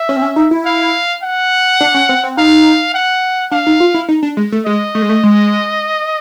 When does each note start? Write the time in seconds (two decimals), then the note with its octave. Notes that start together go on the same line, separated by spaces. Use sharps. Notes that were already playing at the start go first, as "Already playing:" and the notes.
Already playing: E5
0.09 C#4
0.16 C4
0.22 C#4
0.36 D#4
0.51 E4
0.65 F5
1.23 F#5
1.81 D4
1.94 C#4
2.09 C4
2.24 C4
2.37 D#4 F5
2.94 F#5
3.51 D4 F5
3.67 D#4
3.80 F4
3.94 E4
4.09 D#4
4.23 D4
4.37 G#3
4.52 A3
4.66 G#3 D#5
4.95 A3
5.02 G#3
5.09 A3
5.24 G#3